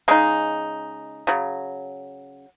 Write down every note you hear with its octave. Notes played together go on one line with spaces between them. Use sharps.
C#3 G#3 D#4
C#3 F#3